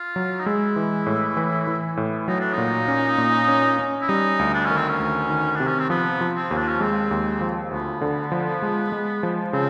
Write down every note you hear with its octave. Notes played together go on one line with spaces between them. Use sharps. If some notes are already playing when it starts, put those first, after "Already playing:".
Already playing: F4
F#3
D#4
G#3 E4
E3
A2
E3
E3
A2
F#3 D#4
D4
A#2 D#4
C#4
A#2
C#4
C#4
E4
G3 D#4
D2
D4
D#3 C#4
C4
C#4
D2
D#3
C3 D4
C#4
C4
F3 B3
F3
C4
D#2
D4
C#4
G#3 C4
D#2
F3
D2 B3
D3
F3
G#3
G#3
F3
C#3 C4